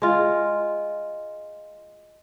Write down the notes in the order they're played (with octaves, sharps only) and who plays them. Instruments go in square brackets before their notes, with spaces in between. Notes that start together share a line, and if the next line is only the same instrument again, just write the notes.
[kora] G#3 F4